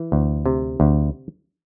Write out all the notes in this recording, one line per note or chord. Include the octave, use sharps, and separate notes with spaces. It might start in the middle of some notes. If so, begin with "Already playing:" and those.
Already playing: E3
D2
C3
D2